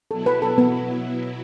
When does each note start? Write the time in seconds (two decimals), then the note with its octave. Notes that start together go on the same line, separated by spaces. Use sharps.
0.11 B2 F#3 B3 E4 A4
0.26 B4
0.42 A4
0.58 B3